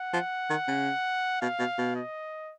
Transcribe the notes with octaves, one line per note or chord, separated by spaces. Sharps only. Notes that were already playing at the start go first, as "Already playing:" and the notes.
Already playing: F#5
F3
D#3
C#3
B2 F5
B2
B2
D#5